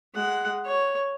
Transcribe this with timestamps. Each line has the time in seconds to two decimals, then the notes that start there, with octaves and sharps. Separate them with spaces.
0.14 G#3 F#5
0.65 C#5